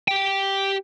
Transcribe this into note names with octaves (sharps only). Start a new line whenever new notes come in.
G4 G5